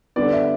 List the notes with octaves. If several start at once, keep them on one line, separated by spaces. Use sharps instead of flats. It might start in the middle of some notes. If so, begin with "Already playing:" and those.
D3 G3 B3 D5
E5